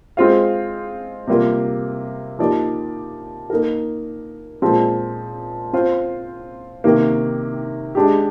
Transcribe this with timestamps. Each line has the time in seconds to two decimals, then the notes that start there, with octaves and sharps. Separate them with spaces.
0.17 G#3 C4 F4 C5 F5
1.27 C3 G3 A#3 F4
2.39 F3 A#3 D#4 G4 D5
3.50 A#3 D#4 A#4
4.62 A#2 F3 G#3 C4
5.73 C4 F4 C5
6.84 C3 D#3 A#3
7.95 G#3 D4 G4